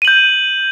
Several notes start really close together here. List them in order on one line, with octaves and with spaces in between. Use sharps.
D#7 F#7 G6